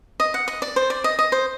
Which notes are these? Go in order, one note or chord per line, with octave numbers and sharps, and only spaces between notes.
D#5
F#5
D#5
D5
C5
D5
D#5
D#5
C5